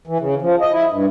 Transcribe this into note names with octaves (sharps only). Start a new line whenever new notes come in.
E3
C#3
F3
D#5
E4
G2